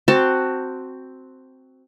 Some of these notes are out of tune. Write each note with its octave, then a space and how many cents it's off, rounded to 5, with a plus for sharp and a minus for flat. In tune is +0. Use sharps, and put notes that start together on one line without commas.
C4 +0 F#4 +5 A5 +15